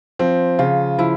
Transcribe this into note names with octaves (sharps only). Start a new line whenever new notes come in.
F3 C4
C#3 F4
F3 E4